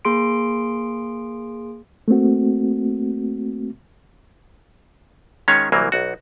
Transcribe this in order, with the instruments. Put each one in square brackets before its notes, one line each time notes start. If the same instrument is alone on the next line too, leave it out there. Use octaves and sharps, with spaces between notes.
[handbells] A#3 G#4 C6 D7
[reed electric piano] A3 A#3 C4 F#4
[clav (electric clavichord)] D#3 G#3 C#4 C#5 F5
C2 E3 F#3 A#3
B1 F#4